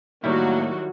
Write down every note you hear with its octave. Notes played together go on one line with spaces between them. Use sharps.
A2 D#3 F#3 G3 A#3 E4 F#4